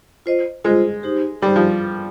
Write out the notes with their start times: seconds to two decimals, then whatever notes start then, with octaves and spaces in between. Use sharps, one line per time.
0.26 F4 C5 D#5
0.64 G#3 F4 C5 D#5
1.03 D#4 G4 C5
1.42 G3 D#4 G4 C5
1.56 F3